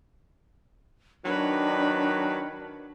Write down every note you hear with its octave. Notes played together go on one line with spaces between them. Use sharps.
D#3 F#3 D4 B4